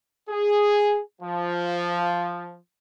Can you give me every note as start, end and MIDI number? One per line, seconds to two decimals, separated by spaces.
0.29 1.00 68
1.21 2.57 53